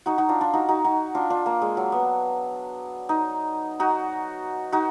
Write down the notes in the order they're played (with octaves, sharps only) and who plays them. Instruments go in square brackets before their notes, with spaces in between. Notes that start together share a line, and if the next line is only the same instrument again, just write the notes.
[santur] D#4 F#4
D#4 F#4
D4 F4
D4 F4
D#4 F#4
D#4 F#4
D#4 F#4
D4 F4
D4 F4
A#3
G#3
F#3
B3
D#4
D#4 F#4
D#4 F#4